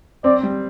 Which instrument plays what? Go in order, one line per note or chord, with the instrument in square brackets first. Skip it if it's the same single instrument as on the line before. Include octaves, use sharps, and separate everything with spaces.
[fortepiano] C4 [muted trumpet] D5
[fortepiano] G3